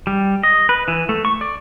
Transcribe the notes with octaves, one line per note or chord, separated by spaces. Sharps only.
G3
D#5
B4
E3
A3
C#6
D5